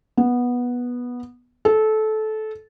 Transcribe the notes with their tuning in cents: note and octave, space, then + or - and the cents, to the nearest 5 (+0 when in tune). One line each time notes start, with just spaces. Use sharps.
B3 -10
A4 -20